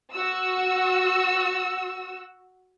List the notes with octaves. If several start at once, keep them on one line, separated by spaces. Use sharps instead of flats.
F#4 E6